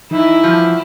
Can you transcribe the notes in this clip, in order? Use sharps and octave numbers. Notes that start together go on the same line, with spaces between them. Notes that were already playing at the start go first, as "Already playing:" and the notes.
E3 D#4 E4
G2 A#2 F3 F#4